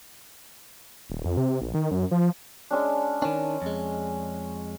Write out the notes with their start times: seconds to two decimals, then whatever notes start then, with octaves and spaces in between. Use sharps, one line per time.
1.10 D#1
1.25 F2
1.37 C3
1.49 C3
1.61 A#1
1.74 D#3
1.91 F#2
2.11 F3
2.71 G#3 C#4 D4
3.22 D#3 C#4 D4
3.62 F2 G#3